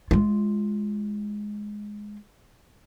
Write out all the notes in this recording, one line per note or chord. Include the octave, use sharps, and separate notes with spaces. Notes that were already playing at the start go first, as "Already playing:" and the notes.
G#3 F4